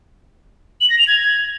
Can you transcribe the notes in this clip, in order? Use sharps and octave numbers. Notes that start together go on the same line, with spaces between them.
F#7
A#6
F7
G#6